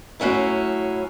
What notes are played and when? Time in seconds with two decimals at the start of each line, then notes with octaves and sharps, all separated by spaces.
0.20 A2 F#3 C#4 E4